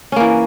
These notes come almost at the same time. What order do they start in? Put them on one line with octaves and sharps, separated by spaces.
C#4 A#3 E3